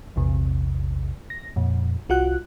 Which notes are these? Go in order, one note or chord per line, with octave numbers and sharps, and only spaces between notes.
A#1 E2 C3
A#6
F2 A#2
C2 F4 F#4 F#5 F#6